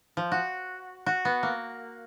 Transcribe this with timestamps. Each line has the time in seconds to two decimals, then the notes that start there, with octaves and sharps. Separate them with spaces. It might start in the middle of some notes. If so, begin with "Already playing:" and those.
0.17 F3
0.32 F#4
1.06 F#4
1.25 B3
1.43 A#3